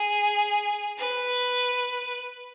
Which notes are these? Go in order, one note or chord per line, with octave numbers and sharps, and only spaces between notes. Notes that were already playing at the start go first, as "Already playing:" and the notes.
Already playing: G#4
B4